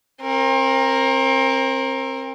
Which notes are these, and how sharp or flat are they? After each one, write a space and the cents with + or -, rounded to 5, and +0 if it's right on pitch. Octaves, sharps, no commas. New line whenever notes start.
C4 +30 A#4 +0